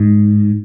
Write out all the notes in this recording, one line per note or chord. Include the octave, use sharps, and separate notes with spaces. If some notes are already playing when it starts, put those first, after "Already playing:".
Already playing: G#2